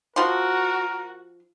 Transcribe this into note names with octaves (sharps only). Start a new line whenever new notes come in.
F3 F#4 A#4 C6